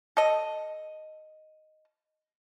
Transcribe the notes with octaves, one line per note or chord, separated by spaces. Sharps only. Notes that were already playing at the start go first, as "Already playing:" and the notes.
A4 D#5